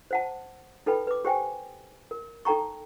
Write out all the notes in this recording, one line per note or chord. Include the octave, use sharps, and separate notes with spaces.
C5 F#5 A5
D#4 A4 B4 G5 B5
B4 D6
G4 C5 G5 G#5
A#4
D#4 A4 G5 A#5 C#6